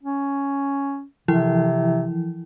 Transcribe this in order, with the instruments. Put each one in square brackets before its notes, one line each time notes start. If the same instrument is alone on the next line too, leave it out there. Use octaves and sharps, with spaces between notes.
[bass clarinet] C#4
[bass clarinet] C3 [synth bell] E3 F3 E4